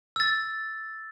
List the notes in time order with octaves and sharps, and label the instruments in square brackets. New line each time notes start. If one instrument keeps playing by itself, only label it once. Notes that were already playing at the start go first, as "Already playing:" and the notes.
[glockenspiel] E6 A6